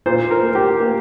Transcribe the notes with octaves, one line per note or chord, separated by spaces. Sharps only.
A#2 C5
A#4
A#3
G4
A#3